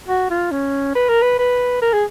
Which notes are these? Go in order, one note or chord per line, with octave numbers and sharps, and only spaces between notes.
F#4
F4
C#4
B4
A#4
B4
B4
A#4
G#4